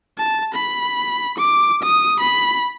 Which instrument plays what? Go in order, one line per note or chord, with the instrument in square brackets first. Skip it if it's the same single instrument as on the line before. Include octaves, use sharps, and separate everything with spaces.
[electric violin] A5
B5
D6
D#6
B5